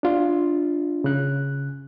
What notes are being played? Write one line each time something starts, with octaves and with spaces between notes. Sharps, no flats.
D4 F4
C#3 F#6